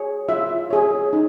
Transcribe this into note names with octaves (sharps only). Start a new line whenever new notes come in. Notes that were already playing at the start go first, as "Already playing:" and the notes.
Already playing: G#4 C#5
F4 E5
G#4 C#5
D#4